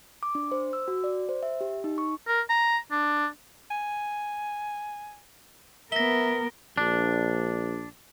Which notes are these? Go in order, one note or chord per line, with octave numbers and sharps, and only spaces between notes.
D6
D4
C5
E6
F#4
D5
C5
E5
G4
D#4
C#6
A#4
A#5
D4
G#5
B3 A#4 E5 A#6 G7
A#1 D4